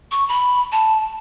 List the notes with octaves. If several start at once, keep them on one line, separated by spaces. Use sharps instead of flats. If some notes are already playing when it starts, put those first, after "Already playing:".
C#6
B5
A5